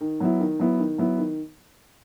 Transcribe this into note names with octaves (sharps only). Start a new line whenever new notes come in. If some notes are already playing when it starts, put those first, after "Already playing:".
D#3
F#3 B3 E4
D#3
F#3 B3 E4
D#3
F#3 B3 E4
D#3